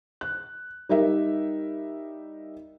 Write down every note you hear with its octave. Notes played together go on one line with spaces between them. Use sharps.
F#6
G3 D#4 G4 A#4 E5